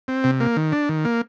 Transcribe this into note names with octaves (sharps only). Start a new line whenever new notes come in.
C4
C3
A#3
D#3
D4
D#3
A#3